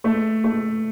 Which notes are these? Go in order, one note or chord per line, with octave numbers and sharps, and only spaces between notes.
A3
A3